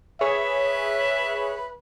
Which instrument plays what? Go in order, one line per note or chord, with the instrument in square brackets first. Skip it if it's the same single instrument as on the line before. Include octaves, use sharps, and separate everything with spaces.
[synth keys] G#4 C#5 [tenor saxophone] B4 [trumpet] E5